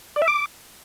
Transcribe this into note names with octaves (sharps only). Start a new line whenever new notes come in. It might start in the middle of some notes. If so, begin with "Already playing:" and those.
D5
E5
D6